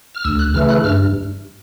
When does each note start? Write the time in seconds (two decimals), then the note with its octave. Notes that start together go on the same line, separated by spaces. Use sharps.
0.15 F6
0.24 D2 E6
0.39 F#6
0.54 C#3 E3 A3 F6
0.69 F#6
0.84 G2 F6